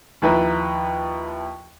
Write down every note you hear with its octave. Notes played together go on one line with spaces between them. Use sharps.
D#2 F3 E4 B4 A#5